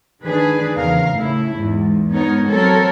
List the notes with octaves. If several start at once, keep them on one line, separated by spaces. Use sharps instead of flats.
D#3 D4 G#4 B4
E2 C#3 A#4 F5
A2 C#3 E4
E2 G#2
G#2 B3 D#4 A#4 C#5
F#3 C4 A4 A#4 C#5